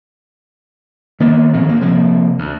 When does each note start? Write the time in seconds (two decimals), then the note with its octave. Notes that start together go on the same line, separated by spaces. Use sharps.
1.20 D#3 A#3 B3
1.53 A#2 D#3 F3 C4
1.65 D2 A#3
1.81 C3 F3 A#3
2.39 D2